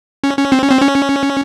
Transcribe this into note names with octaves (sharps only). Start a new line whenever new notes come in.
C#4
C#4
C4
C#4
C4
C#4